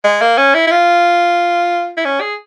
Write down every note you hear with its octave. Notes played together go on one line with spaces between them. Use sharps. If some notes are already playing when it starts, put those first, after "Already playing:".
G#3
A#3
C#4
E4
E4
F4
E4
C#4
G#4